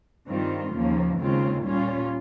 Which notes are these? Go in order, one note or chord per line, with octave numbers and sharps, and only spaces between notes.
G2 D#3 G3 C4 F4
D#2 C#3 F3 A#3
D#2 C#3 G#3 C4 F4
A#2 G3 C#4 F4